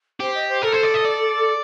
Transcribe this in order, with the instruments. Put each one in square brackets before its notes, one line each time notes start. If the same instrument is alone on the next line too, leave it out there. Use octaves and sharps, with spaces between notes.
[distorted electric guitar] G4 [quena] C5
[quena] D#5
C5
[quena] A4 [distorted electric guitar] A#4
[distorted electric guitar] C5
D5
D#5
D5